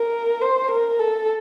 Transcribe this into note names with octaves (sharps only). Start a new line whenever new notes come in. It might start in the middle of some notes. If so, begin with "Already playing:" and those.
Already playing: A#4
C5
A#4
A4